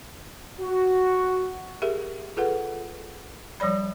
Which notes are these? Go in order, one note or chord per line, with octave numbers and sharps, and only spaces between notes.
F#4
G4 G#4 A#4 E5
F4 G#4 A4 B4 F#5
F3 G3 C#5 D5 B5